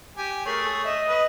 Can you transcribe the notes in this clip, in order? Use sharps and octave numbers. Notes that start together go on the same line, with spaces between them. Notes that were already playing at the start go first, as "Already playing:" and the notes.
G4 G#5
A3 G#4 A#4 C#5
A4
D#5 E5
B4